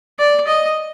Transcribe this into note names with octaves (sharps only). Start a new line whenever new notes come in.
D5
D#5